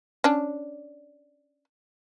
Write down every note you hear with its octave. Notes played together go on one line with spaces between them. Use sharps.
C#4 D4